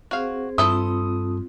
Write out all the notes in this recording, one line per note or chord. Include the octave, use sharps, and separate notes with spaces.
C4 F#4 G#4 C5 F5
G2 C4 E4 F4 A4 C5 D#6